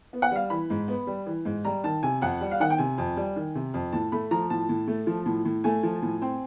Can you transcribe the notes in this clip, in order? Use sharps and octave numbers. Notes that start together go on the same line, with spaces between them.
B3
F#5
G3 F5
E3 B5
G#2
B3
G3
E3
G#2
G3 A#5
D#3 A5
C3 G#5
F2 F#5
G3
F5
D#3 F#5
G5
C3 G#5
F2
G3
D#3
C3
F2
A2 A5
A3 B5
F3 A#5
A2 A5
A2
A3
F3
A2
A2
A3 G#5
F3
A2
C4